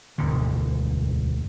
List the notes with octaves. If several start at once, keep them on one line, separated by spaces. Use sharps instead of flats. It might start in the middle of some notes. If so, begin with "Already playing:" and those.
E1 D2 G#2 D3